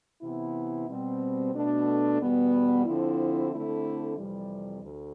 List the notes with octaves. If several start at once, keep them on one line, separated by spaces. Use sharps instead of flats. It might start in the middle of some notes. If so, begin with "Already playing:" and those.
C3 E3 B3 E4
B2 G3 C4
B2 A3 D4
E2 B2 G3 B3
D3 F3 C4 E4
D3 A3 C4 E4
F2 C3 E3 G3
D2